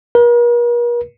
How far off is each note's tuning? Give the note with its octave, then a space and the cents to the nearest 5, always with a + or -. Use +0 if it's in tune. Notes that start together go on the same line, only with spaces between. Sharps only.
A#4 +45